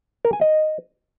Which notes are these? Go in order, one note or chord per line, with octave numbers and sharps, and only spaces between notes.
A#4
G#5
D#5